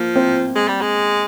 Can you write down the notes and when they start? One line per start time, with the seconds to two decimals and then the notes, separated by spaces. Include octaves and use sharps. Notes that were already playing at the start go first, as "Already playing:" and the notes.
Already playing: F3 A#3
0.15 C4
0.55 G#3
0.68 G3
0.81 G#3